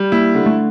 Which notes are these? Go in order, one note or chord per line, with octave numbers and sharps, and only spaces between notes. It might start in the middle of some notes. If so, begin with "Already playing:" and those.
Already playing: G3
A#3 E4
D3
A3